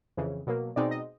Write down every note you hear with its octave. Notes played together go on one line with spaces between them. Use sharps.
F2 C#3 E3
B2 F#3 A#3
B2 G#3 C4 D#4 D5
D#5